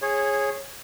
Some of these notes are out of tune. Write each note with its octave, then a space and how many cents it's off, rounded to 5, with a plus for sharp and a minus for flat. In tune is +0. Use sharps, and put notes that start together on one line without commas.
G#4 -5 C#5 -20